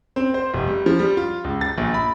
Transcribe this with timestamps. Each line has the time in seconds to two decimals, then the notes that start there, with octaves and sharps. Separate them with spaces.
0.16 C4
0.34 C5
0.54 F1
0.67 G3
0.86 F3
0.99 G3
1.17 F4
1.44 C#2
1.61 A6
1.78 A#1
1.94 B5